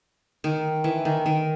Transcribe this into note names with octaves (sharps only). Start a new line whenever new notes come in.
D#3
E3
D#3
D#3